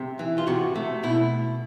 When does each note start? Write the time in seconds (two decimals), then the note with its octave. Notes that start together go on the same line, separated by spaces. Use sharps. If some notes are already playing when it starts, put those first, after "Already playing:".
Already playing: C3
0.19 E3
0.38 F4
0.47 C3 F#4
0.75 A3
1.03 B2 E4